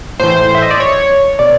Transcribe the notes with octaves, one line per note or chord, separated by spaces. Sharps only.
A2 E3 C5
E5
D#5
D5
C#5
B2 D5